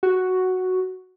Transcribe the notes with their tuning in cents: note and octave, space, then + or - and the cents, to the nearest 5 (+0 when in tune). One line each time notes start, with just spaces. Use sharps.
F#4 +0